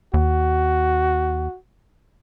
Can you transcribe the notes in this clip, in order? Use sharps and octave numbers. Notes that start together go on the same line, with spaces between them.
D#2 F#4